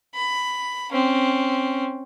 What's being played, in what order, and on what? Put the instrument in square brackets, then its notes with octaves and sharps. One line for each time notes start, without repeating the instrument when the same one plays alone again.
[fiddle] B5
C4 C#4